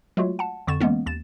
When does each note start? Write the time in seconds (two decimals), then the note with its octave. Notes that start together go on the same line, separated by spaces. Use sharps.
0.17 F#3 G#3 A3 F4 F#4
0.39 F#5 A5
0.67 F2 D3 C#6 A6 E7
0.80 E3 G#3 A#3 B3 C#4
1.06 D#2 A6 E7